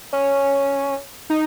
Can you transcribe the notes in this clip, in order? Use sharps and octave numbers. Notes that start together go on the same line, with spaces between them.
C#4
D#4